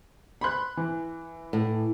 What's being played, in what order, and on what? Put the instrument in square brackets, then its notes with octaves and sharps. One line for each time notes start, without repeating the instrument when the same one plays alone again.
[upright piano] B5 C6 F#6
E3
[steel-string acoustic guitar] A2